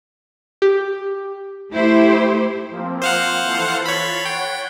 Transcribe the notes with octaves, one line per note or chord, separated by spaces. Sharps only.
G4
A3 E4 G4 C5
F3 A#3 C4
C5 F5 F#5
E3 F4 A4
C#5 B5 A6 C7
C#5 F#5 G5